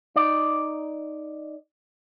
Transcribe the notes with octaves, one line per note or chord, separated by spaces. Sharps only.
D#4 D5